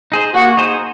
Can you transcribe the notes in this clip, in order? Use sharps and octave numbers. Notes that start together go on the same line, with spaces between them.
D#4 G#4 C5
A#3 F#4
D#4 G#4 C5